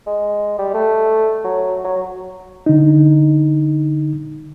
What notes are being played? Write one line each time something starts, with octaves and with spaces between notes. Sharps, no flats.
G#3
G3
A3
F#3
F#3
D3 D#4